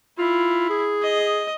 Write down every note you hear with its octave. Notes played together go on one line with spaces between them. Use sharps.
E4 F4
G#4
D#5